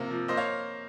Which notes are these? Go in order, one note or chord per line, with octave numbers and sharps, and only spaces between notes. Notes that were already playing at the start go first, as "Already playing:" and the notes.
Already playing: C3 F3 A#3
F3
A#3 C5 D#5
C#5 F5